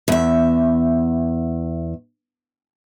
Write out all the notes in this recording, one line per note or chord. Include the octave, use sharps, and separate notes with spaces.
E2 E5